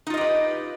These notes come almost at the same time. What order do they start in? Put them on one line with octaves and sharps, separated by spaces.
D#4 F4 D#5 G4 B4